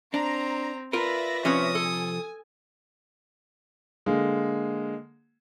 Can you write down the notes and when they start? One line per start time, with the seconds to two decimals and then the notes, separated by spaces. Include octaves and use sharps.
0.14 C4 D4 A#5
0.93 F4 A#4 B4 D5 E5 A#6
1.45 C3 F3 C#4 B4 C#5 D#6
1.75 A4 G#5
4.06 D3 G#3 A#3